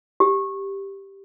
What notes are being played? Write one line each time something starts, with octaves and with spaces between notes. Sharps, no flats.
G4